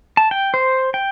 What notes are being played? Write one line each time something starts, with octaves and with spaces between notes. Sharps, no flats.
A5
G5
C5
G5